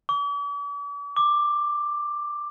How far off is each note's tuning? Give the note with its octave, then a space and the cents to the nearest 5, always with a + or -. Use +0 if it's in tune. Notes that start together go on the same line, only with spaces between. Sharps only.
D6 -45
D6 +10